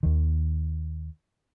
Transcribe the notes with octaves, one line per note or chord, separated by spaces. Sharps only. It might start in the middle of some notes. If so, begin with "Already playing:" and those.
D#2 D#3